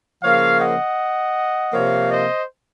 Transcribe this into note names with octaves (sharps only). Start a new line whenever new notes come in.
C#3 F3 A#3 C#5 F5
D#5 F#5
C3 F3 A#3 C#5 F5
C5 D#5